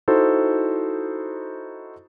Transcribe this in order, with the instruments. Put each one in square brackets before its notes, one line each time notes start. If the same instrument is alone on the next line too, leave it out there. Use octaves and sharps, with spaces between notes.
[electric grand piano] D#4 E4 F#4 A4 C5